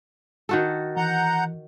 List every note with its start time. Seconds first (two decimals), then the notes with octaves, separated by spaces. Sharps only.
0.49 D#3 F#4 A4
0.97 E3 F#5 A#5 G6